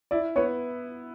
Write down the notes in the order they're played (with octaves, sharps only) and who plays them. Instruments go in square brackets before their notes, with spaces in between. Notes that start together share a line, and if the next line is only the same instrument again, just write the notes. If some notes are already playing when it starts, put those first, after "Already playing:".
[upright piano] E4 [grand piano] D5
[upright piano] B3 [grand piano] C#5